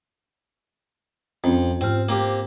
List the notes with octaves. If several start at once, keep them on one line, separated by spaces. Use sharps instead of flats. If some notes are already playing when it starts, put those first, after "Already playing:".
F2 C4 C#4
G#2 C4 F4 F6
A#3 C4 G4